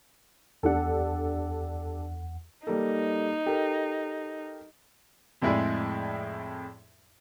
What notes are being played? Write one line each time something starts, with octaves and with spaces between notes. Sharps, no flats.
E2 D4 G4 A4 F#5
G3 A#3 D#4 A4
G4 A4 A#4
F2 A2 G#3 E4 G#4 D5